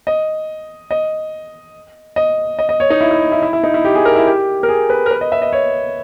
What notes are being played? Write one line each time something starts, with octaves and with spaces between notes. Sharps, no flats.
D#5
D#5
D#5
D#5
D#5
C#5
D#4
E4
E4
E4
E4
E4
D#4
E4
G4
G#4
A#4
E4
G4
A#4
G#4
B4
A#4
B4
D#5
E5
D#5
C#5